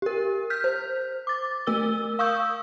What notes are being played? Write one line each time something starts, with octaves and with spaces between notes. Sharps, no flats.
G4 A#4
F6 G6 B6
C5
D6 A6
A3 A#4 E6 G7
F5 C#6 D#6 E6 G6